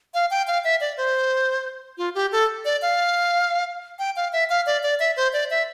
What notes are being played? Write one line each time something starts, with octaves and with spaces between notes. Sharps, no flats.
F5
G5
F5
E5
D5
C5
F4
G4
A4
D5
F5
G5
F5
E5
F5
D5
D5
E5
C5
D5
E5